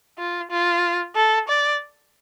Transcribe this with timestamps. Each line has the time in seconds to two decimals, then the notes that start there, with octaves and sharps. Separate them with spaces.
0.18 F4
0.50 F4
1.15 A4
1.48 D5